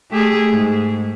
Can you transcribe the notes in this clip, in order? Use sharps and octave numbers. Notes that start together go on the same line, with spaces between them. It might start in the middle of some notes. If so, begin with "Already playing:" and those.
A3 G4 G#4
G#2